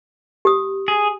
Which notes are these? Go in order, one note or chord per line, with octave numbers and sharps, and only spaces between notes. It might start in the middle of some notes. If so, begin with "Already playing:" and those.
G4 D#6
G#4